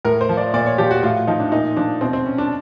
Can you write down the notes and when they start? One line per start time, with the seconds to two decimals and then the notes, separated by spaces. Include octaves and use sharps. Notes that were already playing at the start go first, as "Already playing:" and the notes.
0.05 A2 A#4
0.21 C5
0.29 F3
0.37 D5
0.54 A#2 D5
0.66 C#5
0.78 F3 G4
0.91 F#4
1.03 A2 F4
1.27 F3 D#4
1.40 D4
1.52 A#2 D#4
1.77 F3 D4
2.01 B2 C4
2.13 C4
2.26 C#4
2.38 D4